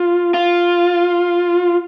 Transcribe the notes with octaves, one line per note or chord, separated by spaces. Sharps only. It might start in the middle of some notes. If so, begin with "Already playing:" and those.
Already playing: F4
F4